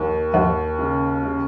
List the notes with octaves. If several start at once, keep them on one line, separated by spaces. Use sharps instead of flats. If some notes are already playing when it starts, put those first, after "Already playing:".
Already playing: D#2
D#2
C#3
C#3